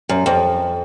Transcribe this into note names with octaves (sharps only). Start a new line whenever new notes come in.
F#2
F2